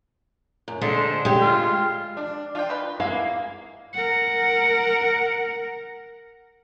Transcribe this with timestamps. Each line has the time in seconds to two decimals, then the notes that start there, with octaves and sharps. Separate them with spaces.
0.68 F#2
0.81 D3 G#3 C5
1.25 G#3 G4
1.42 F4
2.17 D4
2.55 D4 F4 F5 G5
2.69 D#3 D#4 B4
3.00 G#3 A#3 E4 G#4 F5
3.93 A#4 F#5